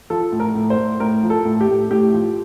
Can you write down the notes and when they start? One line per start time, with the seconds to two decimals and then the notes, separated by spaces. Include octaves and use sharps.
0.10 F3 A4
0.32 A2
0.40 A#4
0.55 A2
0.70 C5
0.78 A2
1.00 A2 A#4
1.23 F3
1.30 A4
1.45 A2
1.61 G4
1.68 A2
1.91 A2 G4
2.13 F3